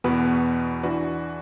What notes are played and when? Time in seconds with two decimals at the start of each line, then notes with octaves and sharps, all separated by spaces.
0.04 E2 B2 B3 F#4 B4
0.83 E3 D4 F#4 B4